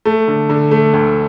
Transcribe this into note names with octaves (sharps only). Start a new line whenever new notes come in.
A3
D3
D3
A3
D2